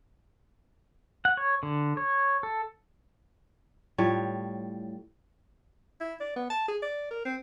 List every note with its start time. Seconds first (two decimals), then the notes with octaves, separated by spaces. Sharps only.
1.25 F#5
1.37 C#5
1.63 D3
1.97 C#5
2.43 A4
3.98 A2 G3 F4 C#5
6.01 E4
6.20 D5
6.36 B3
6.50 A5
6.68 G#4
6.82 D5
7.11 A#4
7.25 C4